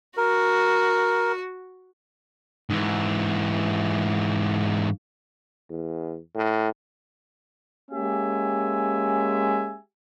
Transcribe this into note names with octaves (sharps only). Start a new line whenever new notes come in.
F#4 A#4
G#2 E3
E2
A2
G#3 A#3 C#4 G4 E5 G#5